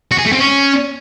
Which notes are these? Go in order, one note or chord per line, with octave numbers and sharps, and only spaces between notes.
F#4
G#4
A3
C4
C#4